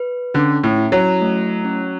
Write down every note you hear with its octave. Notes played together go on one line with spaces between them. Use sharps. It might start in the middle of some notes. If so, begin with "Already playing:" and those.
Already playing: B4
D3 C#4
A2
E4
F#3
A3
C#4